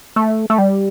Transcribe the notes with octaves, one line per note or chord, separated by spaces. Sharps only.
A3
A3
G3